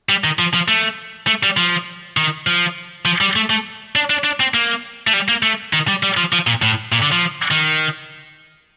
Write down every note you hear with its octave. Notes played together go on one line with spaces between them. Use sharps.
G3
D#3
F3
F3
A3
A3
G3
F3
D#3
F3
F3
G3
A3
A3
D4
D4
D4
C4
A#3
A3
G3
A#3
A3
D#3
G3
G3
F3
F3
A#2
A2
A#2
D3
F3
D#3